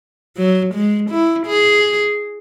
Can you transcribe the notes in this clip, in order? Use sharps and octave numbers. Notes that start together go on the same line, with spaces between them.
F#3
G#3
E4
G#4